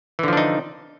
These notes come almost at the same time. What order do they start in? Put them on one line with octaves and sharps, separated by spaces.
E3 D3 F3 D4 D#4